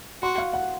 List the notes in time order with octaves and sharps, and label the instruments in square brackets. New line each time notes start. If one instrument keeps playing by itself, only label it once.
[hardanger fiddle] F#4 [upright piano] C6
[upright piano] F5
F#5